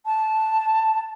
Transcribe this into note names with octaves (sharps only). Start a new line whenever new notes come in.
A5